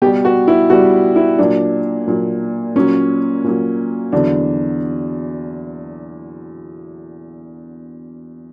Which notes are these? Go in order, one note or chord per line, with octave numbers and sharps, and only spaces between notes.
B2 G3 G4
F#4
E4
B2 G3 F#4
E4
A#2 F#3 D4
A#2 F#3
A#2 F#3 C#4
A#2 F#3
E2 D3 F#3 D4